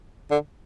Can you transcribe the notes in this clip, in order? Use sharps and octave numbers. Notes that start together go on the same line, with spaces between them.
D3